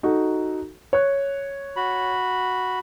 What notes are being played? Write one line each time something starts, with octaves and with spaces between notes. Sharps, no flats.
D#4 F#4 A4
C#5 F#6
F#4 B5